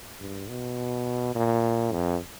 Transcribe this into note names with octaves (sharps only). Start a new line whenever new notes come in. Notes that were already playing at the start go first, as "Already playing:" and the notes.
G2
B2
A#2
F2